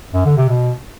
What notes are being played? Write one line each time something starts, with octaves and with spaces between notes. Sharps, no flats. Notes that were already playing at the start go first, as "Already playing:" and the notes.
F#2
D3
C3
B2